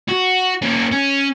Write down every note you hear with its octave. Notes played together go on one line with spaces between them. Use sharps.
F#4
A#3 C#4
C#4